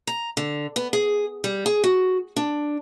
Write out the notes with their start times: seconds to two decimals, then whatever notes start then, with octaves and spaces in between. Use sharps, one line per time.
0.07 A#5
0.37 D3
0.76 B3
0.93 G#4
1.44 G3
1.66 G#4
1.84 F#4
2.36 D4